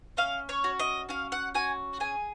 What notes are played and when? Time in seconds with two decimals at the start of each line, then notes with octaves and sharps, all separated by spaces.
0.17 C#4 F5
0.49 C#5
0.64 F#4
0.79 D#5
1.09 C#4 F5
1.32 F#5
1.54 F#4 G#5
2.00 G#4 G#5